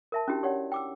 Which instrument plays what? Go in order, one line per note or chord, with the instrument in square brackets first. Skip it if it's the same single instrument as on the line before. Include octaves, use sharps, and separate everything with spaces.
[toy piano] A#4 E5 A5
C#4 D4 E4 F#4 G4
G4 C#5 D5 F#5
G5 D6 E6